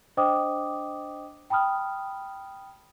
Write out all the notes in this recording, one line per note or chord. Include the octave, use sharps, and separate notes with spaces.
D4 C5 D#5 G5 D6 D#6
G5 A5 B5 D#6 F6